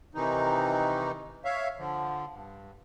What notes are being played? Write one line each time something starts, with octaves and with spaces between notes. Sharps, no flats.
C3 D#3 E3 D#4
C#5 E5 F5
D3 F3
G2